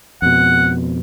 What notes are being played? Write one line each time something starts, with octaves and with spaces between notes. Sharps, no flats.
F2 B2 F#5